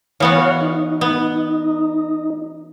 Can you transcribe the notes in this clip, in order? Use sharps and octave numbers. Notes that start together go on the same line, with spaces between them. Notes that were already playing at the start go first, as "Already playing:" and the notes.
E3 B3 F#4 C#5 F5
D#4
B3